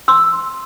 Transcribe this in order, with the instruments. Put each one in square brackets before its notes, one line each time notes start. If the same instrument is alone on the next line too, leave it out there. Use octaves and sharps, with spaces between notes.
[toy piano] C6 E6